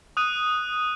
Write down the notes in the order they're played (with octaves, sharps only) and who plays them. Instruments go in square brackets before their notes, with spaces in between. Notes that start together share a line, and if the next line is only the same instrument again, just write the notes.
[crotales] D#6 F#6 D#7